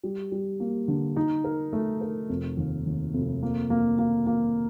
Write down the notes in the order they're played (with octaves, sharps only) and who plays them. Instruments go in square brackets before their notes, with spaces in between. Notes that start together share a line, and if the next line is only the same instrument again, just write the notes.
[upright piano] G3
G3
A#3
D3
D#4
A#4
A3
A#4
F1
D#2
D#2
F1
A#3
A#3
A#3
A#3